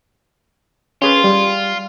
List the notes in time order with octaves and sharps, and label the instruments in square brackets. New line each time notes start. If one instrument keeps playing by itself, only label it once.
[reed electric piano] C#4 G#4 B4 [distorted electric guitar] F4
[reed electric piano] G3